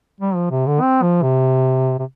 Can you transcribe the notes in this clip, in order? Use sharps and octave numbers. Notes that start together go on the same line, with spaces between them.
G3
F3
C3
D3
C4
F3
C3
C3